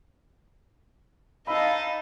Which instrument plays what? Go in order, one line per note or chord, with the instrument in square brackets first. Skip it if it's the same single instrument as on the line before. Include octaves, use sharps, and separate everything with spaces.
[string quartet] D#4 [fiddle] D#5 A5 [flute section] F5 E6 [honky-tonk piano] B5